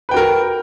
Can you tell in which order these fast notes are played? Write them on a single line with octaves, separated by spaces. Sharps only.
B4 G5 F#4 A#4